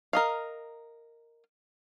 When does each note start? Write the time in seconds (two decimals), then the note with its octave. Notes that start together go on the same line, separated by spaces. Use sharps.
0.13 A#4 D#5 F5